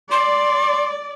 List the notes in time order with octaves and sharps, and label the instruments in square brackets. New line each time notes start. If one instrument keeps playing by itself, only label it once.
[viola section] D5 [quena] C6